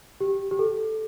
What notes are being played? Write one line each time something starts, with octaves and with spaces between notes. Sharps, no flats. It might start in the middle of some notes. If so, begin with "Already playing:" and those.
G4
G4
A4